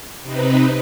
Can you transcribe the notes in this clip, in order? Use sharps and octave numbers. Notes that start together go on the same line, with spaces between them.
C3 C4 D#4 B4